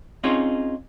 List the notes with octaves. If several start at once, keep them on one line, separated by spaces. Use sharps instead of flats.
C4 C#4 D#4 F4 G#4 C#5